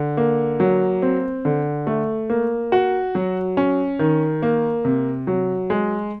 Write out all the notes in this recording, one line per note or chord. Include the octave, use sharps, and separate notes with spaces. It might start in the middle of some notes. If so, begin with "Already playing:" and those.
Already playing: D3
A#3
F#3
C4
D3
A3
A#3
F#4
F#3
C#4
D#3
A#3
C3
F#3
G#3